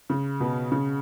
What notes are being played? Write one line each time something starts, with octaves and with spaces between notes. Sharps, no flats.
C#3
B2
C#3